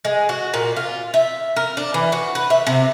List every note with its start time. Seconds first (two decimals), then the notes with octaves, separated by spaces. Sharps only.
0.05 G#3
0.29 F#4
0.54 A#2
0.76 F4
1.14 E5
1.56 A#4
1.77 D4
1.94 E3
2.12 F#4
2.35 B4
2.50 E5
2.67 C3